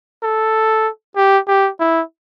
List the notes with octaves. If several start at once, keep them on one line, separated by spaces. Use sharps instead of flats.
A4
G4
G4
E4